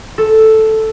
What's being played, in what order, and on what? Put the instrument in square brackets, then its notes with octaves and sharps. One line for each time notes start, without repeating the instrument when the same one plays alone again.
[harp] A4